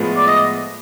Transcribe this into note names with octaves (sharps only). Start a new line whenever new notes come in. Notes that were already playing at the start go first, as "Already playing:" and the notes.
Already playing: A2 F3 G#3 B3
D5
D#5